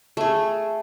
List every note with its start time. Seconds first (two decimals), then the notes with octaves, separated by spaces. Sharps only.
0.17 A3 G#4